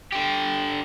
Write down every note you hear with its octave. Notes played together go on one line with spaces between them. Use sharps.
D3 G4